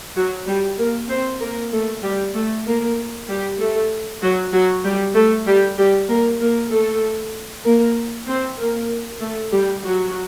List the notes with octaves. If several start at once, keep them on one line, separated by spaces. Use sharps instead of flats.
F#3 F#4
G3 G4
A#3 A#4
C4 C5
A#3 A#4
A3 A4
G3 G4
A3 A4
A#3 A#4
G3 G4
A3 A4
F#3 F#4
F#3 F#4
G3 G4
A3 A4
G3 G4
G3 G4
A#3 A#4
A#3 A#4
A3 A4
A#3 A#4
C4 C5
A#3 A#4
A3 A4
G3 G4
F#3 F#4